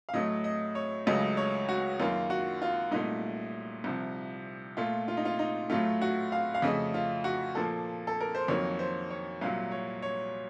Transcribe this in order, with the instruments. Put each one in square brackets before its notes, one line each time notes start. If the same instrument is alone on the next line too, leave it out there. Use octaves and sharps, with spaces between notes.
[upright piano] F5
A2 F#3 A3 D#5
D#5
C#5
C#2 C#3 F#3 A3 D#5
C#5
F#4
F#2 D#3 A#3 F4
F#4
F4
C2 A#2 A3 D#4
C2 C3 F3
A#2 A3 F4
F4
D#4
F4
D#4
A2 F#3 A3 F4
F#4
F5
F5
F2 C#3 A3 D#5
F4
F#4
A#2 F3 A#3 A4
A4
A#4
C5
F2 D#3 F#3 A#3 C#5
C5
C#5
C2 A#2 F#3 F5
C#5
C#5